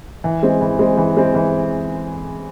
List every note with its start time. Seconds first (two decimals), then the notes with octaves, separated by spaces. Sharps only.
0.24 E3
0.43 G#3 C4
0.61 E3
0.79 G#3 C4
0.97 E3
1.17 G#3 C4
1.35 E3